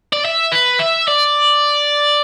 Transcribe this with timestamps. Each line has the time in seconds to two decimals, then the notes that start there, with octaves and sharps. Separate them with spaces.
0.13 D5
0.25 E5
0.52 B4
0.80 E5
1.08 D5